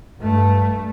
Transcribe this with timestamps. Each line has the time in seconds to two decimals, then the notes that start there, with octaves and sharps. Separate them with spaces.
0.21 G2 A3